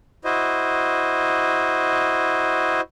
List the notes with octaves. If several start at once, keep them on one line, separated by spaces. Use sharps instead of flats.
E4 F#4 C5 D#5